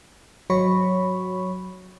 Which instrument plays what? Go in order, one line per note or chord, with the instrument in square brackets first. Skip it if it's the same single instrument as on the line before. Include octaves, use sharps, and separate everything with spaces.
[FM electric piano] G#1 F#3 F#4 C#5 B5 C#6